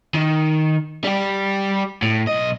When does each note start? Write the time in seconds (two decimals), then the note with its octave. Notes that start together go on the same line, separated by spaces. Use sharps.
0.14 D#3
1.04 G3 G4
2.02 A2
2.27 B1 D#5